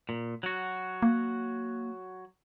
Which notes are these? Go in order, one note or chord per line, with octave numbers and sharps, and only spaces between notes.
A#2
F#3 F#4
A#3